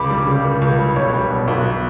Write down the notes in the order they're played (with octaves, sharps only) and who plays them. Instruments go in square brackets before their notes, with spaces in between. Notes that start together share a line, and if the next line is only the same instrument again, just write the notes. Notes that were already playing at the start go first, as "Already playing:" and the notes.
Already playing: [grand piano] C#2 B5 D6
G3
C#3
C#2
C#2
G3
B1 C#5
G3
B2
B1